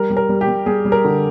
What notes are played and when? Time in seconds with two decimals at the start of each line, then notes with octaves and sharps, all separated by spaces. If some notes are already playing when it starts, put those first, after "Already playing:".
Already playing: G3 A#4
0.10 G3
0.17 A#4
0.29 G3
0.41 G4
0.47 G3
0.66 G3 G#4
0.85 G3
0.92 A#4
1.05 D3